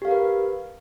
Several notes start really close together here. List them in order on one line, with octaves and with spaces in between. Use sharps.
G4 F5 A#4 B4